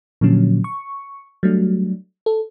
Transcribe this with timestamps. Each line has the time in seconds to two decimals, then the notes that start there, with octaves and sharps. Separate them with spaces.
0.21 A#2 D3 F3 F#3 C#4
0.64 C#6
1.43 F#3 G3 A3 D4
2.26 A4